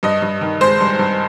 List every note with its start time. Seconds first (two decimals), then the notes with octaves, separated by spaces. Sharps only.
0.03 G2 D#5
0.22 G2
0.41 D#3
0.61 G#3 C5
0.80 G2
0.99 G2